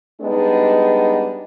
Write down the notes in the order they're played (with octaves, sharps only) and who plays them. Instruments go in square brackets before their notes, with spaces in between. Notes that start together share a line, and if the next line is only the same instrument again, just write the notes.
[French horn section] G3 G#3 B3 D4 D#4